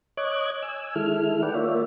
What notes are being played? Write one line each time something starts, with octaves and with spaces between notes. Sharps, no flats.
C#5 D#5 D6 F#6 G#6
G#5 E6
D#3 G#3 E4 A4 F6
A4 B4 D5 F#5 G5
A#3 F4 C#5 D5 E5